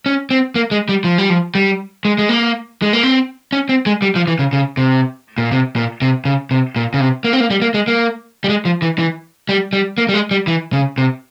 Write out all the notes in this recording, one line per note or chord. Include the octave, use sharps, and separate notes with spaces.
C#4
C4
A#3
G#3
G3
F3
G3
F3
G3
G#3
G#3
A#3
G#3
A#3
C4
C#4
C4
G#3
G3
F3
E3
C#3
C#3
C3
A#2
C3
A#2
C3
C#3
C3
A#2
C#3
C3
A#3
C4
A#3
G3
A#3
G#3
A#3
G3
G#3
F3
E3
E3
G3
G3
A#3
G3
G#3
G3
E3
C#3
C3